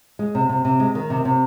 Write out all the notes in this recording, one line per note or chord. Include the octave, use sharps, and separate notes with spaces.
G#3
C3
C3
C3
G#3
D#3
C3
C3